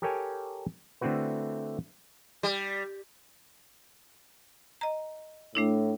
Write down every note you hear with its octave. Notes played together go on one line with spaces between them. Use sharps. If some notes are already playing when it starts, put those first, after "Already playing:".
G4 A4 A#4 C#5 G5 G#5
D3 A3 C4 E4 F#4 B4
G3
D#5 A#5
A2 A3 D4 E4